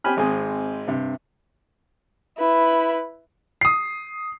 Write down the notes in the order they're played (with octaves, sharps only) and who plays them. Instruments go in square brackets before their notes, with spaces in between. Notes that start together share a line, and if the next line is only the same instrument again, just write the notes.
[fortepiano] C4 G4 G#5 B5 F6
G#1 G#3 C4 G#5 D#6
G2 C3
[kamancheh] E4 B4
[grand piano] D#6 C7